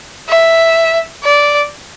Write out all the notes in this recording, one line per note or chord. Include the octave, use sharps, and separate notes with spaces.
E5
D5